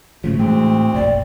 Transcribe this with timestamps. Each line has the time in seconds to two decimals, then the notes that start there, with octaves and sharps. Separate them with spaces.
0.24 G#2 C#3 F3 A3
0.39 D2 A2 E3 G#3 C4
0.94 F1 A#1 D5